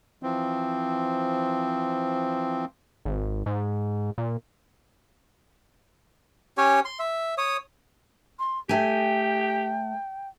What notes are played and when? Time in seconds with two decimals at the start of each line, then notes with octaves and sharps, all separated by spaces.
0.23 E3 F3 C4
3.05 G#1
3.46 G#2
4.18 A#2
6.57 C#4 G4 C#5 G#5
6.85 C6
6.99 E5
7.38 C#5 D#6
8.39 C6
8.69 A3 G4 G5 G#5